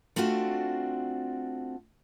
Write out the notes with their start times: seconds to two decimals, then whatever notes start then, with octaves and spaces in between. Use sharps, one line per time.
0.16 A3 C4 D4 F4 F#4